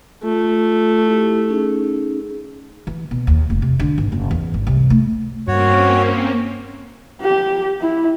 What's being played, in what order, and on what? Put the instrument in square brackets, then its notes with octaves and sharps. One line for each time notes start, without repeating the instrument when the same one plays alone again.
[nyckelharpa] A3 [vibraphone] F4
[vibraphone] E4 G4
C#4 D#4 G#4
[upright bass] E3
B2
D#2
F1
C3
D3
G#1
F#1
E2
G#1
C2
A3
[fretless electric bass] G2 [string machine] A#3 C4 C#4 [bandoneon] F#4 C#5
[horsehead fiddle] G4
E4